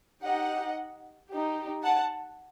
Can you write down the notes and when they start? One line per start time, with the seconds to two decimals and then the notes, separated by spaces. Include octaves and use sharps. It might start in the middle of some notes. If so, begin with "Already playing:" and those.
0.22 D#4 G4 D#5 F#5
1.29 D#4 G4
1.83 F#5 A5